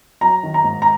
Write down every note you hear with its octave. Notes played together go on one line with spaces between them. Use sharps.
F#3 A#5
D#3
A#5
G#2
A#5